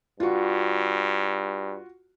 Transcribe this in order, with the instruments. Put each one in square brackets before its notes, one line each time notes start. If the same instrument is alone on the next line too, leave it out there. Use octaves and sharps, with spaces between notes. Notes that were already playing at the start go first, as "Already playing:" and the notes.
[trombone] G2 [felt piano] F4 F#4